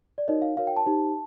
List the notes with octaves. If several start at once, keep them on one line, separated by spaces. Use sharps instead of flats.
D5
D#4 F#4 A#4 C#5 D#5
F5
D#4 F#4 A#4 C#5 F5
G5
A5
D#4 G4 C5